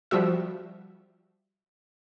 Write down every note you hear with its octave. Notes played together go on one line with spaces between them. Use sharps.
F3 G3 F#4 E5